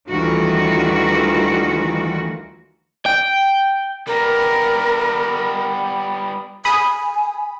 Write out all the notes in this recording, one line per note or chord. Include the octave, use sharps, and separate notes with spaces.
D2 D#3 E3 G3 F4 F#4
G5
G3 B3 A#4
G#5 B5 D#6